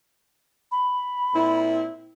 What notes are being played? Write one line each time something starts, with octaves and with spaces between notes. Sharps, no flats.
B5
A#2 C4 E4